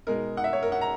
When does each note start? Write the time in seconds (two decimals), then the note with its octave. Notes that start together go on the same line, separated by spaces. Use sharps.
0.07 B2 G#3 D#4 A#4
0.37 F#5
0.44 E5
0.53 C#5
0.63 A#4
0.72 F#5
0.81 A#5